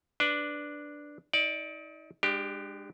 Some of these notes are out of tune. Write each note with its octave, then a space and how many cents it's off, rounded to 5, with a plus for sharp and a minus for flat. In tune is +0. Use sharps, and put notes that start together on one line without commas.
D4 +0 B4 +0
D#4 +35 D5 +0
G#3 -25 D4 +25 G4 +0